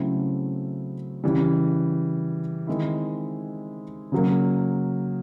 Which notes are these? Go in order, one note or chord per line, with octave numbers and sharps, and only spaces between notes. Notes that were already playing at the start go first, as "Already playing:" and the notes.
Already playing: C#3 F#3 A3 C4 E4
C#3 E3 G3
D#3 G#3 C4 E4
C#3 F#3 A#3